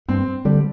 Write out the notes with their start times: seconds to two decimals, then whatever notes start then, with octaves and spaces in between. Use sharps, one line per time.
0.08 G2 C4
0.45 D3 G3